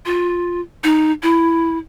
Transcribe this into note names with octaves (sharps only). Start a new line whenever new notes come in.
F4
D#4
E4